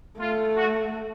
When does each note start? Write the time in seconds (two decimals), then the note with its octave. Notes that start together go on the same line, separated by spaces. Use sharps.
0.19 A3 F4
0.56 F#4